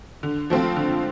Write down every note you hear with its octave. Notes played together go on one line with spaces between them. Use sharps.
D3
F3 A3 C4 F4
D3